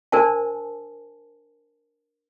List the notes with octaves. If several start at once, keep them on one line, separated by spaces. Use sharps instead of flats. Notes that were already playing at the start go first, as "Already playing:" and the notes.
D4 A#4 C5 G#5 A5